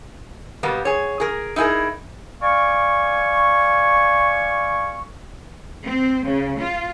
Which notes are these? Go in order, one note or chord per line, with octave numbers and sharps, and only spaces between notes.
B2 G3 A#3 B3
G#4 C#5
G#4 A#4
D#4 E4 G4 G#4 A#4
D5 F5 G#5 C#6
C4
C#3
F4